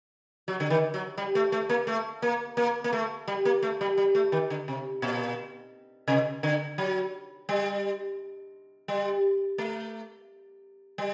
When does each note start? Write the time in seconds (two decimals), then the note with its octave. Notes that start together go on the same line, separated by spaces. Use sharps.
0.48 F#3
0.60 D3
0.70 D#3
0.94 F#3
1.18 G3
1.35 A3
1.52 A3
1.69 A#3
1.87 A3
2.22 A#3
2.57 A#3
2.84 A#3
2.93 A3
3.28 G3
3.45 A#3
3.63 A3
3.81 G3
3.98 G3
4.15 A3
4.32 D#3
4.50 D3
4.68 C3
5.02 A#2
6.08 C3
6.43 D3
6.78 F#3
7.49 G3
8.88 G3
9.58 A3
10.98 G3